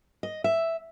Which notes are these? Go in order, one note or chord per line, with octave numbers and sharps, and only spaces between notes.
D#5
E5